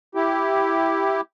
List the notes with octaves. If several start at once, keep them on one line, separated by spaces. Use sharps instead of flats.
E4 G4